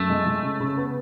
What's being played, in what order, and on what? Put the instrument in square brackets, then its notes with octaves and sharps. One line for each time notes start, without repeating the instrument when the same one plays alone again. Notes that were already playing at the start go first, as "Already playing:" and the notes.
Already playing: [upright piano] F#2 [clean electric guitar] A3
[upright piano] G#3
G#3
C#3
C#3
B3